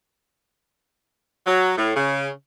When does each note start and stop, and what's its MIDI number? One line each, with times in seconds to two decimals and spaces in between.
1.47 1.73 54
1.78 1.93 45
1.96 2.29 49